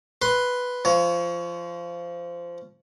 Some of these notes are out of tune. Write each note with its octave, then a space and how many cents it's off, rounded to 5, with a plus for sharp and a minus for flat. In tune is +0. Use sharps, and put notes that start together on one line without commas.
B4 +0 C6 +0
F3 -15 C#5 +20